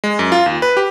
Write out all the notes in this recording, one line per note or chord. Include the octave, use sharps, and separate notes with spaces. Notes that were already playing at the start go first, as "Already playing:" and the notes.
G#3
F#2
F4
D#2
B4
G4